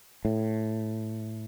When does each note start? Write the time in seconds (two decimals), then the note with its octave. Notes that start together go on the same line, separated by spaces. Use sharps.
0.25 A2